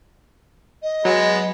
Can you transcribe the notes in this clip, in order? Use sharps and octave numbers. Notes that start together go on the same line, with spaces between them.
D#5
F#3 G#3 B3